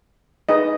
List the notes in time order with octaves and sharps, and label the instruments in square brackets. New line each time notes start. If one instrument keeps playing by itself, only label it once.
[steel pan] D#4 G#4 B4 D#5